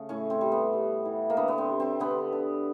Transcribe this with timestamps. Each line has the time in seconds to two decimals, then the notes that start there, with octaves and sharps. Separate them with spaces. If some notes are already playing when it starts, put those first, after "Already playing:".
Already playing: C#3 A3
0.09 A2 C#4
0.30 C4
0.41 G3
0.52 B3
0.73 G3
1.05 E3
1.30 A#3
1.37 D3 B3
1.48 B3
1.58 C4
1.69 G3
1.80 C4
2.00 D3 B3
2.32 D3